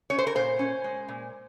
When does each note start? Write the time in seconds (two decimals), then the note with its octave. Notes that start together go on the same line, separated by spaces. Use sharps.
0.10 C#4 C#5
0.18 C5
0.27 A#4
0.35 A#2 C5
0.59 C#4
0.84 G#3
1.08 A#2